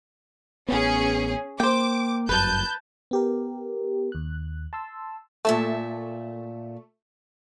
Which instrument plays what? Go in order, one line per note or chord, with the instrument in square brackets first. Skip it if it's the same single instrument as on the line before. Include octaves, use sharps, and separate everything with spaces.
[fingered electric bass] A1 B3 [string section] C#4 G#4
[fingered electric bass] A#3 [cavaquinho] C5 G5 [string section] D6
[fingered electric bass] G1 F#2 [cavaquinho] B4 [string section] A5 G6
[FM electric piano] B3 G4 A#4
D#2 F#6
A5 C6 E6
[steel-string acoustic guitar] A#2 E5 A5 [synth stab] A3